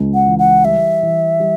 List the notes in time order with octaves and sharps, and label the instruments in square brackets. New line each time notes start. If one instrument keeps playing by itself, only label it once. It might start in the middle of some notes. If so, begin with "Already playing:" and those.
Already playing: [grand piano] C#2
[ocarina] F#5
[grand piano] E3
[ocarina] F#5
[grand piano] G3 [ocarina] E5
[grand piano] E3
G3